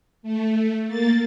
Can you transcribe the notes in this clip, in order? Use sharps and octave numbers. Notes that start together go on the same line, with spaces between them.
A3
A#3 A6